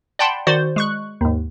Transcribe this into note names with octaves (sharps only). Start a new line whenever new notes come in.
D5 F#5 G5 A5 B5 C6
D#3 F#4 C5 D5
G#3 C#6 F#6
D#2 G#2